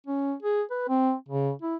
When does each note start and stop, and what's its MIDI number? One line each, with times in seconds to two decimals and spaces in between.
0.07 0.34 61
0.43 0.62 68
0.71 0.85 71
0.89 1.13 60
1.29 1.52 49
1.62 1.76 64